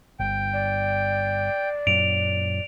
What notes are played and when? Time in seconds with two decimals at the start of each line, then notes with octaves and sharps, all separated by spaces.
0.20 G1 G5
0.53 D5
1.87 F#2 A#2 F#3 D7 F7